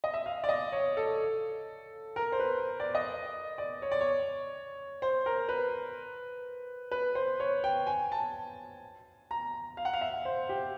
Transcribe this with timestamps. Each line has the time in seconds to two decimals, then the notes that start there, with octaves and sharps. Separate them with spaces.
0.04 D#5
0.14 E5
0.26 F5
0.44 D5
0.49 D#5
0.72 C#5
0.97 A4
2.16 A#4
2.32 C5
2.40 B4
2.80 D5
2.95 D#5
3.58 D5
3.82 C#5
3.91 D5
4.01 C#5
5.02 C5
5.26 A#4
5.49 B4
6.91 B4
7.15 C5
7.40 C#5
7.64 G5
7.87 G#5
8.12 A5
9.31 A#5
9.77 F5
9.85 F#5
9.93 F5
10.01 E5
10.25 C5
10.49 G4